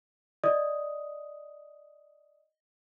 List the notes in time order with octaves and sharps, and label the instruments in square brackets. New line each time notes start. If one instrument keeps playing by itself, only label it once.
[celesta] D5 D#5 D#6